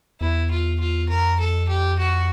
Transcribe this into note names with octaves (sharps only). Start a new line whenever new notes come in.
E2 E4
F4
F4
F2 A#4
A4
G4
F#4